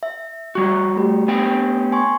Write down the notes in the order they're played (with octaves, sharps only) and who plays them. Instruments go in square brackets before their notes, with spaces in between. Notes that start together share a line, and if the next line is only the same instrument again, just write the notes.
[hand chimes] E5
[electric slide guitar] G3 F#4 [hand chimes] C#6
[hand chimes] A3 G4
[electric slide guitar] B3 C#4 G5
[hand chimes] G#5 C6 C#6